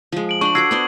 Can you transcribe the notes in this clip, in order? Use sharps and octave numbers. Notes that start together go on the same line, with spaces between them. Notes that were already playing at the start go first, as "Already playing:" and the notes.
F3 G#3
D7 F#7
D4 C5 C#6 F#7
F#4 A4 D6 E6 G#6 C7
B3 D4 C5